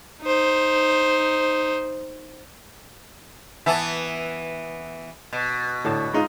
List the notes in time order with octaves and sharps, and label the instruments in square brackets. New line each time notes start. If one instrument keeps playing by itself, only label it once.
[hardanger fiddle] D#4 C5
[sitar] E3 B3 [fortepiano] E5 G#5 A5
[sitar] B2
[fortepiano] A2 D3 A5
G#3 D#4 F4